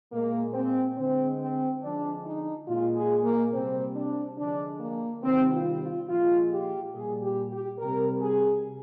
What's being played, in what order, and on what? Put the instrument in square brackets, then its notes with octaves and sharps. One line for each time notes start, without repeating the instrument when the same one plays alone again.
[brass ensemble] A#2 G#3 A#3
C4
D3 G#3 C4
C4
D3 F3 G#3 D4
D#4
A#2 G#3 F4
G#4
A#3
C3 G3 C4
D4
D3 F3 G#3 D4
A#3
C3 D#3 G3 C4
F4
F4
A#2 F3 G#3 F4
G4
A#2 G3 G#4
G4
G4
C3 G3 A#4
G#4